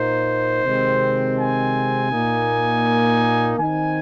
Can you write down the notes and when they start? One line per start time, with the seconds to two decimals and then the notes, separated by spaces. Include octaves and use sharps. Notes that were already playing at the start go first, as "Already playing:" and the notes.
Already playing: A#2 A#3 D#4 C5
0.63 C3 D#3 G#3 C4
1.37 G#5
2.11 A#2 A#3 D#4
3.58 D#3 C4 D#4 G#5